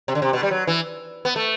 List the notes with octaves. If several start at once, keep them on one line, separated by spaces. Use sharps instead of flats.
C3
D3
C3
B2
G3
F#3
E3
B3
A3